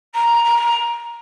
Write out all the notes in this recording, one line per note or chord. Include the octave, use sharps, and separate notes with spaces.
A#5
A#5